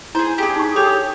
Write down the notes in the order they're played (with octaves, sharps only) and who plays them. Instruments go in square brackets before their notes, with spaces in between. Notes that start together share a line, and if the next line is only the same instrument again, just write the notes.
[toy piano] E4 [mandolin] G#4 C5
[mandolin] D4 G4 [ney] G#4
[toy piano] D#4 C#6
[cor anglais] G4 [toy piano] A4 [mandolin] C#5